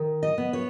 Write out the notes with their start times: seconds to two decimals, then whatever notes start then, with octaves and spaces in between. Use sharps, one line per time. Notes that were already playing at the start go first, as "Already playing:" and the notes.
Already playing: D#3
0.23 D#5
0.38 B3
0.53 C#5